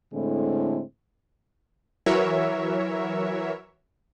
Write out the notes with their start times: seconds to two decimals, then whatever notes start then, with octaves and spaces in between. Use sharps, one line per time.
0.13 A2 D3 G#3 C4 E4 G#4
2.06 E3 F#3 A#4 C#5 E5